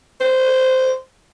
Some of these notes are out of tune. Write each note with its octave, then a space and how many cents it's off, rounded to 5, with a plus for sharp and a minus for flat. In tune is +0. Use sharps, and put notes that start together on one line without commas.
C5 -10